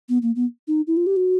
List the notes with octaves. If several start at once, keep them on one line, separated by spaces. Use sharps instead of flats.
B3
A#3
B3
D#4
E4
F4
G4
F#4